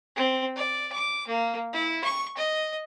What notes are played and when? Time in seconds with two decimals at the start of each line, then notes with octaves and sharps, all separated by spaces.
0.16 C4
0.56 D5
0.92 D6
1.27 A#3
1.73 E4
2.04 C#6
2.37 D#5